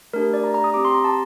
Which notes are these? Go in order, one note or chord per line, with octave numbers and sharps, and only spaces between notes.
A3 D4 G4 A#4
D5
A#5
A#5
D#6
C4 G4 D6
C6
A#5
A5